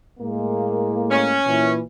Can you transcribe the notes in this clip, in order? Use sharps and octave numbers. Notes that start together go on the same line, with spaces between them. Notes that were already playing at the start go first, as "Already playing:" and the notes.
A2 G#3 A#3
C#4
A#2 E3